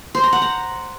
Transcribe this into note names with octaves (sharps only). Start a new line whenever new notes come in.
C5
A#5
F#5
A#5